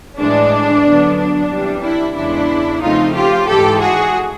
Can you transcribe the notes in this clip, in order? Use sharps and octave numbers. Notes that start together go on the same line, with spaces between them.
A2 E3 G#3 D4
D3 F#3 B3
D4
C3 E3 G3
D4 E4
E2 C#3 E3 G#3 D4 E4
C#3 F3 A3 C4 D#4 F4
F4 G4
G#2 E3 G#3 G4 A4
F#4 G#4